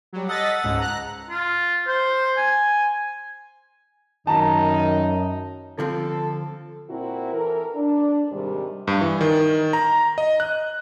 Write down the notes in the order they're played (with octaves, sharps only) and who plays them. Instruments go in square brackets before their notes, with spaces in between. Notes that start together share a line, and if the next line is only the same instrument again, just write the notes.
[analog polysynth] F#3 G3
[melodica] A4 F#5 [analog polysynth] D#5 A6 B6
[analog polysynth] C#2 G#2
A#5 F#6
[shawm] F4
C5
G#5
[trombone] F#2 [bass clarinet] D#3 [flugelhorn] D#4 [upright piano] A5 A#5
[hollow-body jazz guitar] D3 F3 C4 [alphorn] A4
[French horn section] A#2 C4 E4 F#4 A#4
E3 A4 A#4
D4
G#2 C3 D#3 G3
[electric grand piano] G2
E3
D#3
A#5
D#5
F#6